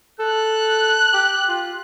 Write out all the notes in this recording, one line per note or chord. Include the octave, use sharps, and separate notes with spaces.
A4 F#6
G4
F4